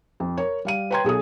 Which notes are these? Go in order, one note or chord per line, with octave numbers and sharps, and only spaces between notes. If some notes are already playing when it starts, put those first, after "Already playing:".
F2
A#4 C#5
G3 F5 D#7
B4 C#5 G5 A#5 C6 G#6
B1 G#4 A4 D#6